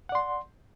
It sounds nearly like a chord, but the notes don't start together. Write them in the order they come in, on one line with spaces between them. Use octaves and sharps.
F#5 D5 C6